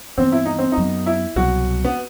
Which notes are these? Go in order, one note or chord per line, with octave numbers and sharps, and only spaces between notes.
G2 E3 B3 C4
E4
D#4
C4
D#4
F#2 F#3 B3
E4
C2 B2 F#3 F#4
B3